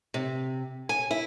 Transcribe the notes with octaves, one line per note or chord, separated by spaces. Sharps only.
C3
G#5
E4